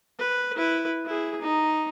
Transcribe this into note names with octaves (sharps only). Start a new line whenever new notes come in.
B4
E4 B4
E4 G#4
D#4